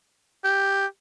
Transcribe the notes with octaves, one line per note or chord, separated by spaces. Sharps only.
G4